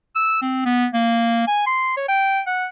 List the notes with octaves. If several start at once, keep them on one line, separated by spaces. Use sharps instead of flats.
E6
C4
B3
A#3
G#5
C6
C#5
G5
F#5